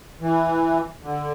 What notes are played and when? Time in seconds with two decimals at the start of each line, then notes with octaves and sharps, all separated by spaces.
0.21 E3
1.03 D3